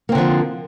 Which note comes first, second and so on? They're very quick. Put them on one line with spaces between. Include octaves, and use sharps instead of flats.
A#3 C4 D3 F3